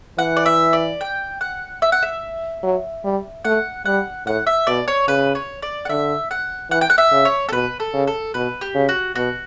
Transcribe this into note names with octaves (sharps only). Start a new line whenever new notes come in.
E3 F#5
D5
E5
D5
G5
F#5
E5
F#5
E5
F#3
G3
A3 F#5
G3 F#5
A2 F#5
E5
B2 D5
C#5
C#3 B4
C#5
D5
F#5
D3 E5
F#5
E3 F#5
G5
F#5
E5
C#3
C#5
A4
B2 B4
A4
C#3
A4
B2 B4
G4
C#3
F#4
B2 F#4